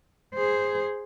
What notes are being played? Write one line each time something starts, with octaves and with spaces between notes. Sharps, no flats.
G#4 C5